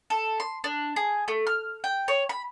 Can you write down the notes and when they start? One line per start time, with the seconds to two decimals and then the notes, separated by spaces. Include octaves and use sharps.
0.10 A4
0.40 C6
0.64 D4
0.96 G#4
1.28 A3
1.47 F6
1.84 G5
2.08 C#5
2.29 B5